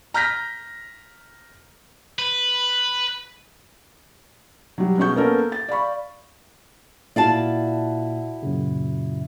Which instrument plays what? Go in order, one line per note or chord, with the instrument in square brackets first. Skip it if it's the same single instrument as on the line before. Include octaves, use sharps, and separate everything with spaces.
[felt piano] A#5 F6 G6 A#6 B6
[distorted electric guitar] B4
[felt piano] F#3 G3
B2 C#4 F#4 G#4 C#6 G6
A#3 B3 C#4 A4 A#4
A6
D5 F5 B5 C#6
[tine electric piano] A#2 [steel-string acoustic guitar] E4 F#4 [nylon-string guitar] D5 F5 A5
[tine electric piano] F#2 A#2 C#3